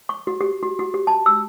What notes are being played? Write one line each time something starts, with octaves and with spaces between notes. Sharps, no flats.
C#6
F#4
G4
F#4
F#4
G4
A5
E6